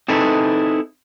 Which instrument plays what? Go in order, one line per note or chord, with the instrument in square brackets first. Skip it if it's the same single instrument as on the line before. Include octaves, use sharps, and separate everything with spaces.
[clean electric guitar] C4 D#4 E4 G#4 A4 B4